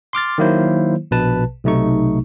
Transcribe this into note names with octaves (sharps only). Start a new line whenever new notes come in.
C6 D6 F6 A6
D#3 F#3 A#3 E4 C5
A#1 B2 B4 A5
B1 C3 A3 D#4 C#6